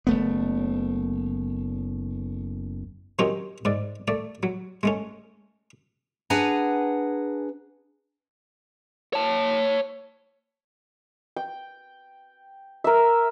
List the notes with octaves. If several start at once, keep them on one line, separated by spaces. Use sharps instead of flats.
F#1 A3 B3
D#3 F#3 C4 C#4 D#4 G4
G#2 D5
A3 D5
F#3
G#3 A3 C#4
D4 G#4 B4 F#5 G#5 A#5
C#5 A5
G5
A#4 E5